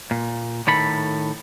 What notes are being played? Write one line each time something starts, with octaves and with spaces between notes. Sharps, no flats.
A#2
A2 D#3 A4 B5